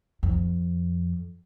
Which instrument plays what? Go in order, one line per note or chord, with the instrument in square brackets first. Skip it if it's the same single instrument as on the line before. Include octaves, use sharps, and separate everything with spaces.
[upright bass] F2